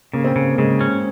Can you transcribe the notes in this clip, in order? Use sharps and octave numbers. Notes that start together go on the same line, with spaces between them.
C#3 A#3
C4
C#3 A#3
A#3
C#3 G#3
C#4